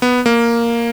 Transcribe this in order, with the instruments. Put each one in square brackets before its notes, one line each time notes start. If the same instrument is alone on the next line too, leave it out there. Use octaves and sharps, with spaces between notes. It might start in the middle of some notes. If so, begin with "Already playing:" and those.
[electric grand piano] B3
A#3